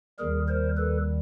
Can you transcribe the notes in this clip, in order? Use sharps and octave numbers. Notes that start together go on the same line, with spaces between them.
D#2 D#3 G3 G#4 A#4
A#4 C5
A4 B4